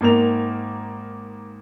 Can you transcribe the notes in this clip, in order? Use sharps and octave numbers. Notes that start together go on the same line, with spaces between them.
G#1 A#3 A#4 F7